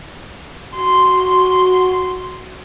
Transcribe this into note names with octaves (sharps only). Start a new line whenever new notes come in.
F#4 C6